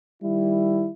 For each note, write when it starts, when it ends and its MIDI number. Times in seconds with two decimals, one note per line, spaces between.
0.23 0.90 51
0.23 0.90 55
0.23 0.90 64